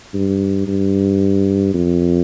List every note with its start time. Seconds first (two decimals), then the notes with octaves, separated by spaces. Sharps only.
0.14 G2
0.67 G2
1.74 F2